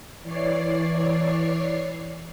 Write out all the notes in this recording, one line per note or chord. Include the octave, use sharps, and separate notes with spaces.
E3 C#5 D5 C7